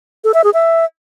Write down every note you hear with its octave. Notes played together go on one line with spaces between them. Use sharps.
A4
E5
G#4
E5